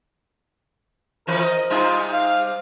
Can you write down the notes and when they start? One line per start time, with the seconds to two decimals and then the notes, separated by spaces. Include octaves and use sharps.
1.27 F2 E3 A#4 B4
1.42 D#5
1.70 C3 G3 D#4 F4
2.13 F5